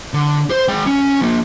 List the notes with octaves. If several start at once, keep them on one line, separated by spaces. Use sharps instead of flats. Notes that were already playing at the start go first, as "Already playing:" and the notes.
D3
C5
G#3 G5
C#4
F3 A#3